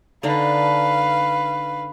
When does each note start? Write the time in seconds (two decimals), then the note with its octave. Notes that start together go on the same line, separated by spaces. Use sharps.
0.23 D3 D4 D#4 B4 F5